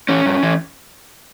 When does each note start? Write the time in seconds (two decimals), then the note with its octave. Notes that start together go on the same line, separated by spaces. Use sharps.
0.09 E3 C#4
0.26 G2
0.43 E3